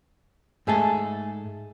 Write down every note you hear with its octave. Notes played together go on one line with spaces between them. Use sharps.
G#2 A3 G#4 A4